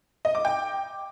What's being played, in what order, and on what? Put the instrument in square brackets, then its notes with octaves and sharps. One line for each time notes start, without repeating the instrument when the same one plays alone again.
[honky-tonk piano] D#5
D6
G5